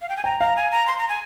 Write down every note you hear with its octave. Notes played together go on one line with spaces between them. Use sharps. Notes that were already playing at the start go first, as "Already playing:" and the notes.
F5
G5
G#5
G5 A#5
F5 A#5
G#5
A#5
C6
A#5
G#5